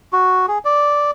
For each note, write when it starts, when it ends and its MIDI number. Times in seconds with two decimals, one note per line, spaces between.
0.13 0.46 66
0.48 0.58 68
0.65 1.11 74